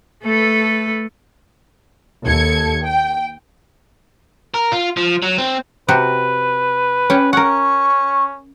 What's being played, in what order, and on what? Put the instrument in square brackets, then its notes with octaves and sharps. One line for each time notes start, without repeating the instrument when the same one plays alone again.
[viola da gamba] A3 A4 B4
[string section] D#2 A4 G#6 C#7
G5
[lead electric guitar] A#4
F4
F3
F#3
C4
[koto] C3 F#4 G4 [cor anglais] B4
[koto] C#4 G4
[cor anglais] C#4 [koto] A#4 F#5 [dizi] C#6